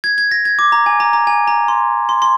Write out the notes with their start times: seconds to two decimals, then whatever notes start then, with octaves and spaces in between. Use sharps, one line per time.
0.04 G#6
0.18 G#6
0.31 A#6
0.45 G#6
0.59 D6
0.72 A#5
0.86 G#5
1.00 A#5
1.13 A#5
1.27 G#5
1.47 A#5
1.68 C6
2.09 C6
2.22 C6